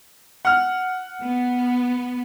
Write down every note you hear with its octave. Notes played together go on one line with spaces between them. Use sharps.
F#5 F6
B3